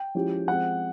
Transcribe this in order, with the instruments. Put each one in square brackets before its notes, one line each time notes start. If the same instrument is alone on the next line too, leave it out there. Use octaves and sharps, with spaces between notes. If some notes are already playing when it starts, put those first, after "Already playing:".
Already playing: [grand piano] G5
[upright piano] F3 G#3 C#4 E4 G4
[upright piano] F3 G#3 C4 [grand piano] F#5